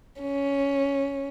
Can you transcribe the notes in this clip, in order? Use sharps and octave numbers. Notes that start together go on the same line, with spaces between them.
C#4